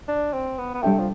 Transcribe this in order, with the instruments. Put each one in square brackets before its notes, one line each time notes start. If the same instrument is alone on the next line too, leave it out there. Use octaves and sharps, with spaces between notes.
[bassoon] D4
C4
B3
B3
[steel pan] G3 D4 A4 E5 G5 [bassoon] A3
[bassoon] F3